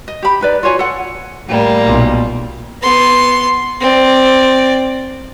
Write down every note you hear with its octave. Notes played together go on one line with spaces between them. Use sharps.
D#5
G4 B5
D#4 B4 D5
F4 F#4 C#5 G#5
A4 F#5
A2 G3 A#3
B1 A#2
B3 C6
C4 D5